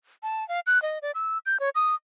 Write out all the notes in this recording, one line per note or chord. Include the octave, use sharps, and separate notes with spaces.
A5
F5
F#6
D#5
D5
E6
G6
C#5
D#6